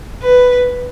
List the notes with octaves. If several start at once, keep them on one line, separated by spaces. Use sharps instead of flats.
B4